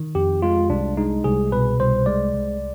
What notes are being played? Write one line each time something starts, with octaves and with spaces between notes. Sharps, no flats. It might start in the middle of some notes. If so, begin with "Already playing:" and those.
Already playing: D#3
F2 G4
G#3 F4
C2 D4
G#3 D#4
C2 G#4
B2 B4
C2 C5
G#3 D5
C2